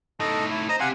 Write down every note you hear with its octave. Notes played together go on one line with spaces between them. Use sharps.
A2 D#4 A4 D#5
E4
C5 D#5 A#5 D#6
C4 G4 F5 F#5 G#5